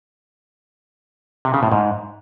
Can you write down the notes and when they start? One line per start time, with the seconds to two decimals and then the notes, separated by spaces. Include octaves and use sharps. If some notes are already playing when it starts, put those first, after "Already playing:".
1.45 C3
1.54 C#3
1.63 A2
1.72 G#2